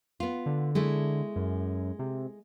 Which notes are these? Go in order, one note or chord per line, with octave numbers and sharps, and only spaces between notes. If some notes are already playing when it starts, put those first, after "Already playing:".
B3 F4
D3
G#3 A3 E4
F#2
C3